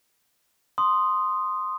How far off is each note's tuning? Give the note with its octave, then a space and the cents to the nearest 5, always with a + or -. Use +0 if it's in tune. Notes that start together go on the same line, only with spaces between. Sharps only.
C6 +0 D#6 -5